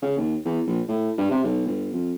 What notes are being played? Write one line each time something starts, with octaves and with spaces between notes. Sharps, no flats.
C#3
D#2
E2
A#1
A2
G2
C3
B1
G1
F2